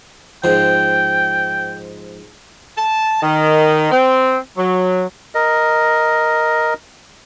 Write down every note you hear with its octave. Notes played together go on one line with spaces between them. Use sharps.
G#2 F3 G5
A5
D#3
C4
F#3
A#4 D#5